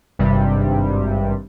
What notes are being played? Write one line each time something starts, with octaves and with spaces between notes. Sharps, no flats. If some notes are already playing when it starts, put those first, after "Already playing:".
G#1 G2 C3 G3